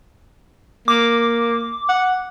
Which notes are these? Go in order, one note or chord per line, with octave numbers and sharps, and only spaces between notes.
A#3 D6
F#5